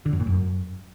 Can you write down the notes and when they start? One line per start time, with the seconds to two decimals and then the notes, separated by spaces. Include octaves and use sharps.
0.06 D3
0.13 F#2
0.20 A2
0.27 F#2